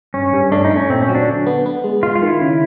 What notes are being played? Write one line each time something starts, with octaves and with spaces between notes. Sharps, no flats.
G2 C#4
G2
A3 D4
D#4
A3
C#4
A#2 C4
C#4
F#3
D4
D3
B3
B3
G#3
G#3 F4
F4
D#3
E4
C#3